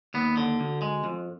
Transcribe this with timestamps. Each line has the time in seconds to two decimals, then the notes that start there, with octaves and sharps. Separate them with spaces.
0.14 D#2 B3
0.37 D3
0.60 D2
0.82 G#3
1.04 F2